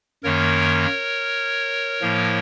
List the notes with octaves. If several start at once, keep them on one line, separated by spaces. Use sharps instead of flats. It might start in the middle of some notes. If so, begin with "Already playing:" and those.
F#2 D#3 A#3 A#4 C#5
A2 F3 A#3